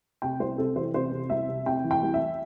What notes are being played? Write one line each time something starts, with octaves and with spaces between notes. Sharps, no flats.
C3 G5
C2 C5
C3 A4
E3 C5
C3 C5
C3
C2 E5
C3
C3 G5
E3
G5
C2
E5